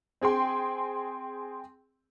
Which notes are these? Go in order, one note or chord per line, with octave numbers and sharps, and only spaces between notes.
C4 G#4 G5 C6